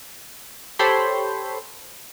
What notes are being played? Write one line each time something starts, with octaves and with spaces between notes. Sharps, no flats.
G4 A4 C5 C#5 B5 C6